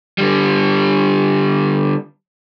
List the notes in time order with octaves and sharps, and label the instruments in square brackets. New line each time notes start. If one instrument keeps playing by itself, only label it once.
[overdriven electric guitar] D3 G3